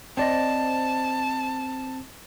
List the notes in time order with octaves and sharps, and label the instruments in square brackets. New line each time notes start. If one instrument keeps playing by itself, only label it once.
[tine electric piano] C4 [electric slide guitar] C5 D5 D#5 [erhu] A5